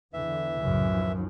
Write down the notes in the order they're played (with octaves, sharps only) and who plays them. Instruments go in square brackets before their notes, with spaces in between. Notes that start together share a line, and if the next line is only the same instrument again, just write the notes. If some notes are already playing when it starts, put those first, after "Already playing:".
[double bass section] E2 D3 [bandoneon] E3 E5
[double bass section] C2 A2 C#3 [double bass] F#2
[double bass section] D#3 F3